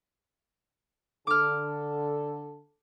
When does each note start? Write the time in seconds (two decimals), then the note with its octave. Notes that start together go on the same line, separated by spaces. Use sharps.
1.27 D3 A4 D6 F6